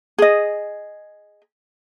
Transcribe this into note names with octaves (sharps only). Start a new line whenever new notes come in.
G#4 D#5